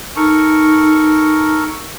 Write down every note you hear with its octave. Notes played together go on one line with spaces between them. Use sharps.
D#4 A4 A#4 C#6